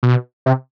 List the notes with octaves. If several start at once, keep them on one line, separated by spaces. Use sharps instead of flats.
B2
C3